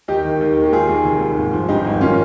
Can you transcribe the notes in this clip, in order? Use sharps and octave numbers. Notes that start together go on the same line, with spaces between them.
D#2 D#4 G4
D#3
D#2
D#3
G4
D#2 F4 G#4
D#2
F1
D#2
G#1
F3
G2 D#4 G4
G#1
D#3 C#4 F4